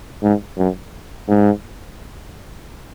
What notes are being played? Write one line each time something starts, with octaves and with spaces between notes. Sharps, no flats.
G#2
F#2
G#2